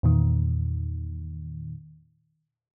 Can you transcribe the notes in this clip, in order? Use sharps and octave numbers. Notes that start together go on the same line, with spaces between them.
E2 A#2 D#3